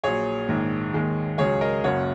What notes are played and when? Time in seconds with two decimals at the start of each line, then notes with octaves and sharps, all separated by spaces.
0.03 A#1 A#2 F#3 G#4 C#5
0.49 A#1 G#2 D#3
0.94 D#2 D#3 G#3
1.38 C#2 C#3 F#3 G#4 C#5
1.61 A#4 D#5
1.83 F#1 F#2 C#3 F#3 C#5 F#5